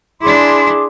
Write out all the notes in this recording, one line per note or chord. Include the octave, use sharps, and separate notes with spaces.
D4 E4 G#4 C6 D6